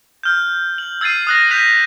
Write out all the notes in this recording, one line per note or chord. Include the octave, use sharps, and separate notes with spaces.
F6 G6
F#7
E6 G#6 A6 C7 D#7
D#6 F#6 A#6
F#6 G6 B6 D#7 F7